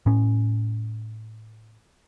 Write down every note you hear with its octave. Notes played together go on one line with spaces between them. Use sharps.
A2 C#4